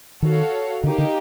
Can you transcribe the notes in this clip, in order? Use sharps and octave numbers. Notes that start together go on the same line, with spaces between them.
D#3 F#4 A4 C#5 F5
D3 A#3 D#4 G4
D3